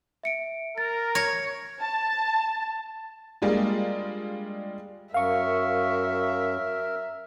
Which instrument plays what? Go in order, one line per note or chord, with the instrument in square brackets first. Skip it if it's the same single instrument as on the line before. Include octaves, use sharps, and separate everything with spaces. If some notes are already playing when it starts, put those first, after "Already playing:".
[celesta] E5 C#7 D7
[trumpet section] A#4 [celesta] A6
[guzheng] C#5 [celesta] A#6
[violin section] A5
[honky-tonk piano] G3 G#3 A#3 D4 F4
[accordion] F#2 [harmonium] A#4 [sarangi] E5 [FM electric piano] F5 C#6